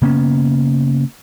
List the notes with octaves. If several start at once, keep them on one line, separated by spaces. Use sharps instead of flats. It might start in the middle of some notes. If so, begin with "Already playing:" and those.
C#3 A#3 B3 C#4